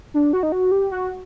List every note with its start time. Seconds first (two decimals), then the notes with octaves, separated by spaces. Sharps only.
0.14 D4
0.33 F#4
0.43 D#4
0.52 F#4
0.71 G4
0.91 F#4